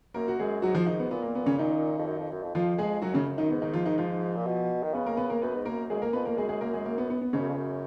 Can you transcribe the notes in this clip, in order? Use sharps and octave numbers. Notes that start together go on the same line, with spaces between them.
F#2 A#3 A#4
F#4
F#2 G#3 G#4
G#2 F#3 F#4
F3 F4
D#3 D#4
B3
A#2 B3
A#3
B3
C#3 C#4
D#3 D#4
F2
F#2
F2
F#2
F2
F2 F3 F4
G#3 G#4
F#2 F#3 F#4
C#3 C#4
D#3 D#4
G#2 B3
D#3 D#4
F3 F4
D#3 D#4
F3 F4
A#2
B2
D#3
C#3 B3 B4
A#3 A#4
B3 B4
A#3 A#4
F#2 B3 B4
G#2
F#2 A#3 A#4
F#2 G#3 G#4
F2 A#3 A#4
F2 B3 B4
A#3 A#4
F#2 G#3 G#4
G#3 G#4
A#3 A#4
G#3 G#4
A#3
B3
B3
B3
G#2 C#3 C#4
F#2
F2
F#2